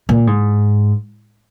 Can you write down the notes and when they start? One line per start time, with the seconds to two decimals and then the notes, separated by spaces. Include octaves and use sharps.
0.09 A#2
0.27 G#2